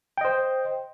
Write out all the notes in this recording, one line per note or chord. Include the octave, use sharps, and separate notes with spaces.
C5 D#5 G5